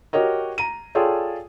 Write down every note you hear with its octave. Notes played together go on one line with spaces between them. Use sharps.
F#4 G4 A#4 C#5 D#5
A#5 D#7
F4 G#4 A4 C#5 D5 G5